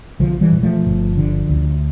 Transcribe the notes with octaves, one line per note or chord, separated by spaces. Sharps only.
B1 D3 F3
E3 G3
B2
F3 A3
G1
D3
D2